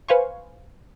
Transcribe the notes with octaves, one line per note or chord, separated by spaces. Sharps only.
B4 C5 F5 G#5 C6 C#6